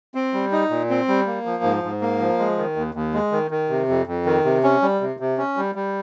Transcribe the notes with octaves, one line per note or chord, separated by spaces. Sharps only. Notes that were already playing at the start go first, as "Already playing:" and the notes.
C4
G3
D#4
A#2
C4
G3
A#3
F3
G#2
G#2
A#3
F3
G#3
D#3
D#2
D#2
G#3
D#3
D#3
C3
F2
F2
D#3
C3
C#4
G3
C3
C3
C#4
G3
G3